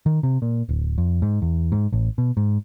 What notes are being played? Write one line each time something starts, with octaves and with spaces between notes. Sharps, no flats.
D#3
C3
A#2
D1
F2
G#2
E2
G#2
A1
B2
G#2